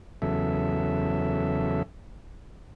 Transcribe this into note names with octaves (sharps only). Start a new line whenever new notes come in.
E2 C#3 F#3 A4 E5